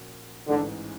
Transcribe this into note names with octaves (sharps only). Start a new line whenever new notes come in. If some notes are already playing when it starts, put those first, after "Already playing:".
Already playing: A#2 F3 A#3 C#4 F#4
A1 G#2 D3 E3